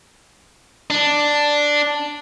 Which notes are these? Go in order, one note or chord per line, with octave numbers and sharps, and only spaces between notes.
D4